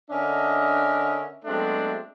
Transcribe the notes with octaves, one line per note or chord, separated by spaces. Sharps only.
D3 C#4 D4 A#4 D#5 E5
F#3 G#3 A3 B3 C4 D4